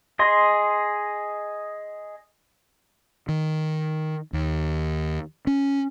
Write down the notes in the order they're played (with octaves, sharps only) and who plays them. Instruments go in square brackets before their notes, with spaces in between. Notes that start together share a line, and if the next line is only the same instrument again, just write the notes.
[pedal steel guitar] G#4 D#5 C6
[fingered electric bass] D#3
D#2
C#4